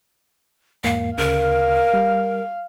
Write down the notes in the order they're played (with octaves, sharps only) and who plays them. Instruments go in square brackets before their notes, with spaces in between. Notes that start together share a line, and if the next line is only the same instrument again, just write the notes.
[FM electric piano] E2 G#2 A#3 [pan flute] F5
[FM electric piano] D2 C#3 [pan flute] A#4 [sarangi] F5
[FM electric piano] G3